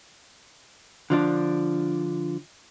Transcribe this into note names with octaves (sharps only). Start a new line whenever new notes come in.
D3 F3 D4